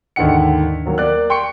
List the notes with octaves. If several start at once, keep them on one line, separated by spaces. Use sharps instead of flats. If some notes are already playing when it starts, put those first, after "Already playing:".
D#2 G#2 D3 D#5 F#5 C#7
D#2 F#3 A#3
A#3 D5 F#6
G5 C6 C#6 C#7